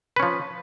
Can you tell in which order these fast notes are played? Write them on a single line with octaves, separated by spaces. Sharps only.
B4 C#4 F3